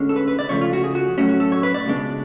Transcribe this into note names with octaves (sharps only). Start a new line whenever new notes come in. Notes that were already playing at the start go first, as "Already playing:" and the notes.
Already playing: D2 D3 G#3 C#4
A4
B4
B4
D5
C#2 C#3 F3 A3 C#5
F4
F#4
G#4
F#4
A2 F#3 A3 C#4 F#4
F#4
A4
C#5
B4
D5
C#2 B2 G#3 D4